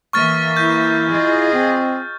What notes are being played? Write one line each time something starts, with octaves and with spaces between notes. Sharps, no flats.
E3 A#3 E5 C#6 F6 A6
E4 G6
F4 G#4 D#5
C4